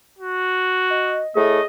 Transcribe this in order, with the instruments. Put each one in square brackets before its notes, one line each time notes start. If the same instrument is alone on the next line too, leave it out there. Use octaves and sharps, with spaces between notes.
[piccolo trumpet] F#4
[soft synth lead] D#5
[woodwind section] A2 A3 [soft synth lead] G#4 [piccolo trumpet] D#5